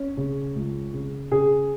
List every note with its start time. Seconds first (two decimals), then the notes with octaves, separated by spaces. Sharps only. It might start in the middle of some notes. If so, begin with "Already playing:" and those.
Already playing: C#4
0.17 C#3
0.55 C#2
0.94 C#3
1.31 C#3 G#4